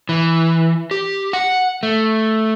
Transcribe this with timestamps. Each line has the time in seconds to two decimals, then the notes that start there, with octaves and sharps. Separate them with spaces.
0.09 E3
0.91 G4
1.33 F#5
1.83 A3